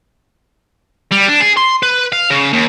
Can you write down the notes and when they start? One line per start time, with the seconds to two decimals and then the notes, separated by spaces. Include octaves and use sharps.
1.11 G3
1.28 D4
1.40 G#4
1.57 C6
1.83 B4
2.12 F5
2.30 C#3
2.53 D#2